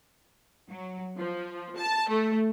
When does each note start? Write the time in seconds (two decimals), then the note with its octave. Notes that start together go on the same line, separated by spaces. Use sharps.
0.69 F#3
1.17 F3
1.77 A5
2.09 A3